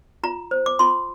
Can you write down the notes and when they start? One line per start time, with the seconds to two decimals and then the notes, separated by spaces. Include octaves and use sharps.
0.23 F4 A#5
0.51 C5
0.66 D6
0.79 F4 C6